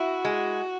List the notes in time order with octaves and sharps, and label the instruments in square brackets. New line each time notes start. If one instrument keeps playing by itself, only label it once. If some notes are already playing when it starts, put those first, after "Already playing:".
Already playing: [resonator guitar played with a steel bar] E4 [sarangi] F#4
[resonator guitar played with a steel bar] G#3